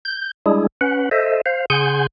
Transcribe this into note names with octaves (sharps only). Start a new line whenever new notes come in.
G6
G3 G#3 D4 E4 G#4
C#4 B4 F#5
A4 C5 D#5 E5
C5 F5
C#3 G#4 F#5 G#5 C6 G6